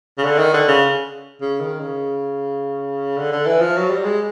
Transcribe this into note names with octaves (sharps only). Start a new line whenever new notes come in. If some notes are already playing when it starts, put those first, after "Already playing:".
C#3
D3
D#3
D3
C#3
C#3
D#3
C#3
D3
D3
E3
F3
F#3
G3
G#3